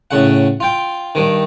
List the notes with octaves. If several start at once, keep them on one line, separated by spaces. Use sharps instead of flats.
A2 C#3 F#5
F4 G5
G2 D#3